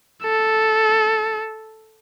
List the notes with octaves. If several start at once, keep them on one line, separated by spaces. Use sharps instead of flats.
A4